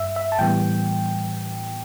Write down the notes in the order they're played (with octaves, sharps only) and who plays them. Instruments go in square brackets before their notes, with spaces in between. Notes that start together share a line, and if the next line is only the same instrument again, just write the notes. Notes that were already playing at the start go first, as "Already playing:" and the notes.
Already playing: [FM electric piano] G2 E5 E6
E5
A5
A2 E3 G3 B3 G5